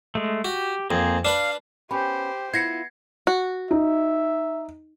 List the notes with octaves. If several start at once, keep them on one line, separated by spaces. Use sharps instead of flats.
G#3 A3
F#4 G4
F2 A#3 C4 G#4
D4 B4 F5 B5
B3 C#4 G4 C5 B5
B3 E4 F4 G#6 A#6 C7 C#7
F#4
D#4 E5